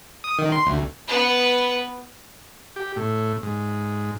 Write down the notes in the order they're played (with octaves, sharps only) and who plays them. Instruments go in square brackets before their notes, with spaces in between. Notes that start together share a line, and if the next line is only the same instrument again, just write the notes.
[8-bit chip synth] D#6
D#3
C6
D2
[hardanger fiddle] B3 B4
[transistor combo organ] G4
A2
G#2